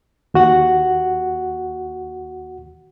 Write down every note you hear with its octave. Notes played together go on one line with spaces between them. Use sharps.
D#2 F#4 F#5